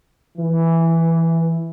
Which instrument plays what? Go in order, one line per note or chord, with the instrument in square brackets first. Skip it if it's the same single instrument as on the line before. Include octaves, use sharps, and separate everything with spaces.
[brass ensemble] E3